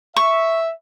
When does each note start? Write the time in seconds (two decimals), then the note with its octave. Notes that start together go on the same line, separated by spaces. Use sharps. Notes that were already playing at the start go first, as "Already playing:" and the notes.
0.16 E5 C#6